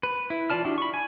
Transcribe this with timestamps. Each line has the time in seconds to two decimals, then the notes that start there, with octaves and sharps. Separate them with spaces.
0.03 B4
0.30 E4
0.50 E3 F4 D5 A5 F6
0.65 D4 E4 F#4 G4
0.78 B5 C#6
0.94 G#5